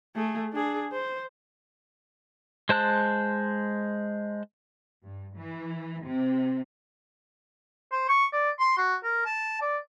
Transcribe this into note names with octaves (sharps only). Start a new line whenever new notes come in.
A3 G#4
D4 G#4
C5
G#3 C5 A5 F#6
G2
E3
C3
C5
C#6
D5
C6
F#4
A#4
A5
D5